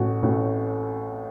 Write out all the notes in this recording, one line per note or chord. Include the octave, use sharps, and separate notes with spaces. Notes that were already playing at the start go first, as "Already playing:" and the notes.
Already playing: A1 A2 A3 F#4
A1 A2 A3 F#4